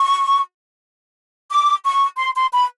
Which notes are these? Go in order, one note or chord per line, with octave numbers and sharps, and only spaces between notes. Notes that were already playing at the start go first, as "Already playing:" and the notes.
Already playing: C#6
D6
C#6
C6
C6
B5